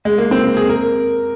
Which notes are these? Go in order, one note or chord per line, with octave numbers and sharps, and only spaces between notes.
G#3
A#3
C4
G#4
A#4